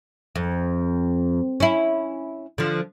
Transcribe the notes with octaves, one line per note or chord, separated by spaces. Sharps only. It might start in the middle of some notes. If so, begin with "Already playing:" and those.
F2
C#4 E4
D3 F3